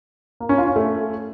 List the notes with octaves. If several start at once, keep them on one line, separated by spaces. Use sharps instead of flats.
A#3
C#4
F4
C#4
A3